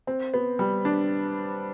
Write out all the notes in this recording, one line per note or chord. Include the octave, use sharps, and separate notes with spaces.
C4
B3
G3
D4